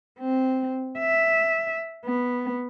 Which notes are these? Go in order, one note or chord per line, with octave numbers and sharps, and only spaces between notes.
C4
E5
B3